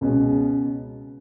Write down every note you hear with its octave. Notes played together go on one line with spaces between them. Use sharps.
C#2 B2 G#3 C#4